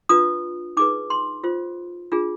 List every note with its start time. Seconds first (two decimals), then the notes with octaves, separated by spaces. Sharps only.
0.09 D4 F4 B4 D#6
0.77 D#4 G#4 B4 D6
1.10 C6
1.44 F4 C5
2.12 D4 F4 G#4